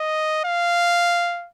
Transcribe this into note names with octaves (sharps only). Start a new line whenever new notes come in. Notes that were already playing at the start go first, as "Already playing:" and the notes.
Already playing: D#5
F5